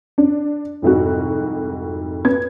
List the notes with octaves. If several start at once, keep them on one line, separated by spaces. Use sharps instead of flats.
D4
C2 F2 G#2 F#4
B3 G#6